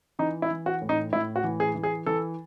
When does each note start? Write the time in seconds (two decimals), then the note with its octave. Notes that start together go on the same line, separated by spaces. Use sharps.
0.19 E3 D#4
0.42 E4
0.50 E3
0.66 F#4
0.82 A2
0.89 D#4
1.12 A2 E4
1.36 F#4
1.44 E3
1.60 G#4
1.75 E3
1.83 G#4
2.06 E3 A4